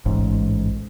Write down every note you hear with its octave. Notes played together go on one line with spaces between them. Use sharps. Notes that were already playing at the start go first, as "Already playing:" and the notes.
A1 G#2